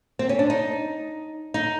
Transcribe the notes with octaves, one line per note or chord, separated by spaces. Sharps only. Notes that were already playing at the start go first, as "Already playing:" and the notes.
C4
C#4
D4
D#4
D#4